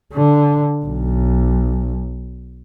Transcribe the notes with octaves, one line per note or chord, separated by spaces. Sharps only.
D3
B1